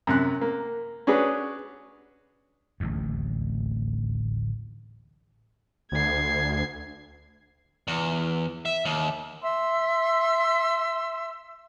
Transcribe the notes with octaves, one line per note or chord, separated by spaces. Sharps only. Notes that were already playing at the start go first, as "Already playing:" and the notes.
F#2 C3 F#6
A#3
C#4 D4 F#4 G#4 B4
D1 A1 D#2
D2 G#6 C7
E2
E5
D#2
E5 C6 E6